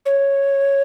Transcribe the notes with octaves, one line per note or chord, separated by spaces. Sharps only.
C#5